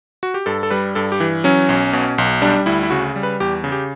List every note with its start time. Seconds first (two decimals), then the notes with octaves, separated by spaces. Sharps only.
0.23 F#4
0.34 G4
0.46 G2 A4
0.63 A4
0.70 G3 B4
0.95 G2 A4
1.12 G4
1.20 E3
1.44 F#3 C#4
1.69 B1
1.93 B2
2.18 B1
2.42 G3 D4
2.66 D2 E4
2.83 E4
2.90 C#3 F#4
3.16 G3
3.23 B4
3.40 E2 G4
3.64 C#3
3.72 G4